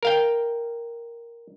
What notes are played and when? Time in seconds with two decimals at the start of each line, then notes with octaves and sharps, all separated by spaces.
0.03 A#4 F5 G5